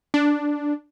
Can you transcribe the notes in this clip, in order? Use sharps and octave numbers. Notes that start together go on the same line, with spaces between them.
D4